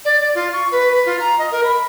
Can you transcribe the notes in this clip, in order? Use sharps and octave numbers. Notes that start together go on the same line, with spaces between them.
D5
D5
F4
C#6
B4
B4
F4
A#5
D#5
A#4
B5